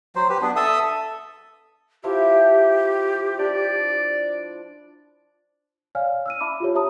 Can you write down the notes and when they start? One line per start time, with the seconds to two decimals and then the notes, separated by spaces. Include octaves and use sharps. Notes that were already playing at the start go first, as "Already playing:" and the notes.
0.15 F#3 C5
0.29 G4 B4
0.42 B3 D4
0.56 A4 E5 D#6
2.04 F3 E4 G4 E5
3.39 D4 D5
5.95 C#5 D5 F5 G#5 F6
6.26 E6 F6 D#7
6.40 E5 A5 B5 D6
6.60 F4 G4 C#5
6.74 G4 C#5 E5 A5 A#5 D#6